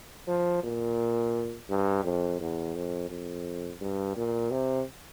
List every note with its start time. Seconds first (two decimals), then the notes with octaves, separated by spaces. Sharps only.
0.27 F3
0.63 A#2
1.70 G2
2.04 F2
2.40 E2
2.75 F2
3.10 F2
3.81 G2
4.17 A#2
4.51 C3